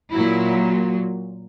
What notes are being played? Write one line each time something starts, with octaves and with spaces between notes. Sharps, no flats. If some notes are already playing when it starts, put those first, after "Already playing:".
A#2 F#3 E4